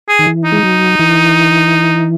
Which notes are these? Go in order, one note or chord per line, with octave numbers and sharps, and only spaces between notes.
G#4
D#3
E3
D#4
G#3
F#3
E3